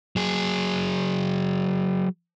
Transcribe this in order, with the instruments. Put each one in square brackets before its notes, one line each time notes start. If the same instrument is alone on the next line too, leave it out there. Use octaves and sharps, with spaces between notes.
[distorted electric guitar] F#3 G#4